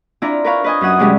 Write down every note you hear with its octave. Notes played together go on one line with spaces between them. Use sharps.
C4 D4 E4 F4 A#5
A#4 B4 C#5 F5
B4 D#5 G#5
F#2 C#4 F#5 D#6
C3 G3 G#3 C#4 D4 E4